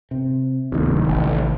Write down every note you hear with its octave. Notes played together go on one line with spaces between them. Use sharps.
C3
D1 C3 D#3 A#3
A1